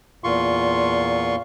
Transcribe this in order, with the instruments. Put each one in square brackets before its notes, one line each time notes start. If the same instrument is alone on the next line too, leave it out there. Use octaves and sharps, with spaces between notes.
[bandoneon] E2 A#2 F4 C6 C#6